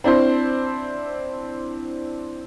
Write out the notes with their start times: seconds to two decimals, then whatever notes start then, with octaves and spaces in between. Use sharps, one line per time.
0.04 C4 D4 E4 C5